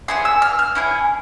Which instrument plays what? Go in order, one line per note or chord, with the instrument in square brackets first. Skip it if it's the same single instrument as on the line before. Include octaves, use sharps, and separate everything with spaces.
[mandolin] C#4 E4 G#4 C6
E6
F6
F6
C#4 E4 G#4